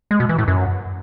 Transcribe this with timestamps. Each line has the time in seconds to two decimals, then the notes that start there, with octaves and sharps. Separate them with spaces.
0.11 G#3
0.20 B2
0.29 E3
0.38 A2
0.48 F#2